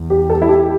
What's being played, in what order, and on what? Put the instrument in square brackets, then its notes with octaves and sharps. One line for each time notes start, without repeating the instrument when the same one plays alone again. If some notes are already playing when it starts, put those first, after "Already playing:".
Already playing: [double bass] E2
[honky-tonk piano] G4
A4
E4
G4